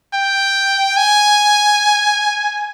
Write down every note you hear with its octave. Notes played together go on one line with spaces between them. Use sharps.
G5
G#5